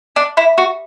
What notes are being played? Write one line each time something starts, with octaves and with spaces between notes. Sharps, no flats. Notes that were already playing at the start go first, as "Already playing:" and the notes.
D4
E4
F#4